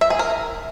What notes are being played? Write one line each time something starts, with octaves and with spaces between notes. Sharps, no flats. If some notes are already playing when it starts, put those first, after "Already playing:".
E5
G#4
A#4